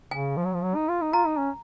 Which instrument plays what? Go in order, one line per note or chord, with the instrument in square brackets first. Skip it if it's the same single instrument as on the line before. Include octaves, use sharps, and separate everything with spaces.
[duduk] C#3 [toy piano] G#5
[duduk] F3
F#3
F3
F#3
D#4
F4
D#4
[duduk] F4 [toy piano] A#5
[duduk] D#4
C#4